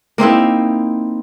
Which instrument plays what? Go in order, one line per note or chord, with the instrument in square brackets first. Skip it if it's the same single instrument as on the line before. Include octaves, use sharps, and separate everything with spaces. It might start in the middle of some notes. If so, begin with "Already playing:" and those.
[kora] A#3 C4 D#4 E4